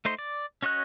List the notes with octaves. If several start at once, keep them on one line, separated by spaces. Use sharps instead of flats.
A3 D#4 C5 C6
D5
C#4 F#4 C#5 D#5 F#6